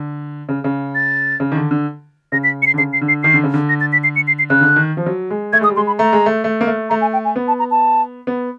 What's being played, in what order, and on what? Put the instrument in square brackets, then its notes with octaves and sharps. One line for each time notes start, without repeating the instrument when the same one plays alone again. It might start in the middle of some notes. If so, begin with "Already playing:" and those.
Already playing: [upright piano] D3
C#3
C#3
[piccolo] A6
[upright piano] C#3
D#3
D3
D3
[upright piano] C#3 [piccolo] A#6
[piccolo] B6
C#7
C7
[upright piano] D3
[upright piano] C#3 [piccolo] C7
[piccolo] C7
[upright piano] D3
[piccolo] C7
[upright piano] D#3 [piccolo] C7
[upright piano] D3
C#3
D3
[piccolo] A#6
A6
B6
C7
C#7
C7
C7
[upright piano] C#3 [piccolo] F#6
[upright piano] D3
D#3
F3
F#3
G#3
[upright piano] A3 [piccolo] G#6
[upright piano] G#3 [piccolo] D#6
[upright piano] G3
[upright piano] G#3 [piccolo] C6
[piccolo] B5
[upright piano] A3 [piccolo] A#5
[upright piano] G#3
A3
A3
A#3
A3
[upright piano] A3 [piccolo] A#5
[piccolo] G#5
G5
G#5
[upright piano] B3
[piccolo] A5
A#5
A5
[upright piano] B3